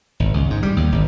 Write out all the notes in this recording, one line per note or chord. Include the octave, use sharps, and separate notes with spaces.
G#1
C#2
G#2
G3
D#2
G#1